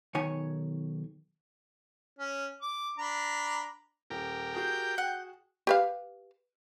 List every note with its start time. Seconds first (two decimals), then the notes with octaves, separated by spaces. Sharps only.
0.15 B1 D#3 C#5 G#5
2.19 C#4
2.62 D6
2.98 D4 A#5 B5
4.10 D#1 G4 A#4
4.55 F#4 G#4 G6
4.98 F#5
5.67 G4 B4 F5